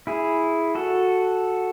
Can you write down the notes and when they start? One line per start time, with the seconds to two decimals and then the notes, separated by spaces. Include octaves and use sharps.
0.07 E4 G#4
0.75 F#4 A4